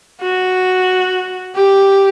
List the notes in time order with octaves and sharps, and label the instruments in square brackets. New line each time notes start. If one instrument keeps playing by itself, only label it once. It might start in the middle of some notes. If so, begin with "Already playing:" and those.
[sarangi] F#4
G4